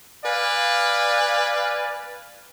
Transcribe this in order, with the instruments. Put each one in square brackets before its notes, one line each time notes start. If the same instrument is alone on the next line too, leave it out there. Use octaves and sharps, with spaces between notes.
[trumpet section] B4 D5 F5 G#5